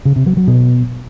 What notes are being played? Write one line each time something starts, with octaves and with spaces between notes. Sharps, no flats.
C#3
C3
F#3
F#3
B2